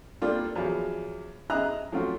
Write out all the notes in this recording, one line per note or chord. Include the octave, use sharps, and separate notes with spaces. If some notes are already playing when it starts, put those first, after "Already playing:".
G3 A#3 C4 D4 F4 A4
E2 F3 F#3
G#4 D#5 E5 A#5 D#6 F#6
F3 F#3 A3 C4 F4 F#4